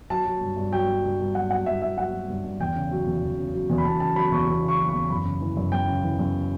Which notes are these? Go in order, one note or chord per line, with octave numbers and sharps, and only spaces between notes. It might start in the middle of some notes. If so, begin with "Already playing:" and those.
F#3 A5
F#3
G2
G2
F#3 G5
F#3
G2
G2
F#3 F#5
F#3 F#5
G2 E5
G2 E5
F#3 F#5
F#3
G2
G2
E2 G5
C#3
F#3
E2
E2
C#3
F#3
E2
B5
E2 A5
C#3 A5
F#3 B5
E2 C#6
E2
C#3
C#6
F#3
C#6
E2
F#2 B5
C#3
E3
F#2
F#2 G5
C#3
E3
F#2